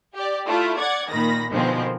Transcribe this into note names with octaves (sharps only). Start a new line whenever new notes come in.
G4 D5
A3 E4 F4
D5 F#5 G#6
A#2 D#3 B5 A#6
B2 D3 D#3 F3 G#3 C4